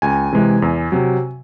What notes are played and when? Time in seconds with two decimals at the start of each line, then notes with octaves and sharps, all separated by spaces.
0.02 C#2 G#5
0.32 C3 E3 G#3
0.62 E2
0.92 C3 F#3